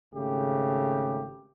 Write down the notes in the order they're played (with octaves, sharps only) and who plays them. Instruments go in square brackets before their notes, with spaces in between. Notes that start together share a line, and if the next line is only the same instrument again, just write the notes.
[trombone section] G#1 C#3 A3 G4